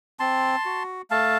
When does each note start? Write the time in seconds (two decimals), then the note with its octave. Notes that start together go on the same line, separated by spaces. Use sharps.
0.20 C4 A5 C6
0.65 F#4
1.10 A3 F5 A5